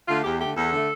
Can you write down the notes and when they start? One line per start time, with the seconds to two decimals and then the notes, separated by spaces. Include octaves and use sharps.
0.08 D3 A3 F4
0.24 E2 G4
0.40 D3 A3 G4
0.56 E2 A4
0.72 D3 A3